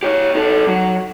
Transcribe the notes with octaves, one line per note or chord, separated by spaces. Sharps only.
G4 C#5
D#4 A4
F#3